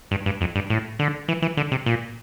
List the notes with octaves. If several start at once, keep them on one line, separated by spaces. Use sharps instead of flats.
G2
G2
F2
G2
A2
D3
E3
E3
D3
C3
A#2